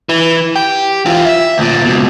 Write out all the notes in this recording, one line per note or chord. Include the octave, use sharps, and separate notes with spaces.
E3
G4
E3 F4
E5
D2 A#2
C#2 B2